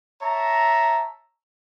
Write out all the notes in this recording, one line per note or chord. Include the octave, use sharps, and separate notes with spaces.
C#5 E5 A5 A#5